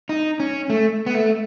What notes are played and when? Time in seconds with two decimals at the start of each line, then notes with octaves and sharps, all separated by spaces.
0.09 D#4
0.40 C#4
0.70 A3
1.06 B3
1.15 A3